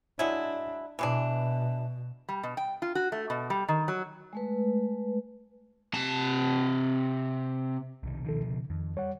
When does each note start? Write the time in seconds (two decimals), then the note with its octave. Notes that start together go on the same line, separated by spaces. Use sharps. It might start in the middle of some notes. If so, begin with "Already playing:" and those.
0.19 F#3 G#3 D4 E4
0.99 B2 E3 G#3 D4
2.29 G3
2.43 B2
2.57 G5
2.82 F4
2.95 F#4
3.12 A3
3.30 B2
3.50 G3
3.68 D#3
3.88 F#3
4.33 G#3 A3 B4
5.94 C3 A5
8.03 B1 C3 D#3
8.24 D2 B2 D#3 F3 A4
8.49 C#3
8.70 F2 D#3
8.97 G3 C#5 F#5